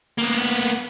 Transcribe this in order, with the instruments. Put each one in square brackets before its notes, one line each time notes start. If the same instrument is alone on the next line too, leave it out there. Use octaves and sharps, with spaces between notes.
[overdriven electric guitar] A#3 B3